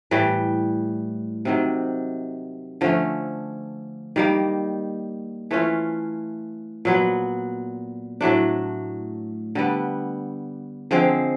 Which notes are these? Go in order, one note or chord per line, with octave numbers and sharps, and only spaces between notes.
A2 E3 G3
C3 D#3 F#3
D3 F3 A3 C#4
D#3 G3 A#3
E3 A3 C#4 F4
A#2 F#3 B3
A2 F#3 A3 D4
D3 G3 B3
D3 F3 G#3 C4